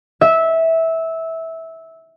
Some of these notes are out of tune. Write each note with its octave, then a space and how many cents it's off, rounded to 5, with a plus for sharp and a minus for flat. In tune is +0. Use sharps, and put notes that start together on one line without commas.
E5 -15